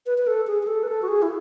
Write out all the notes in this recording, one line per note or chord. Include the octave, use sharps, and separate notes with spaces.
B4
B4
A4
G#4
G#4
A4
B4
A4
F#4
G#4
E4